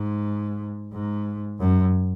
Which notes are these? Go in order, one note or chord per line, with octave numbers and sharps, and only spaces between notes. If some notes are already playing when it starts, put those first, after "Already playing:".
Already playing: G#2
G#2
F#2